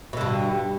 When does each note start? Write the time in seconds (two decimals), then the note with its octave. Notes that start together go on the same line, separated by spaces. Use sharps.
0.13 B2
0.17 D3
0.21 G2